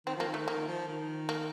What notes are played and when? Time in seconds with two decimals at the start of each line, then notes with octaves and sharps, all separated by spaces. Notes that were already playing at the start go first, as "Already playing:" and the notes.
0.07 D#3 C4
0.16 F3 A#3
0.27 D#3
0.34 A3
0.38 D#3
0.48 D#3 A#3
0.68 F3
0.88 D#3
1.29 A#3